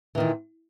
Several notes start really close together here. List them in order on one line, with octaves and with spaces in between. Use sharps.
E3 D#3 A#2